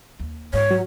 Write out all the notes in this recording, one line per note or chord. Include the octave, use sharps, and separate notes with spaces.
D#2
G#2 C#5
F#3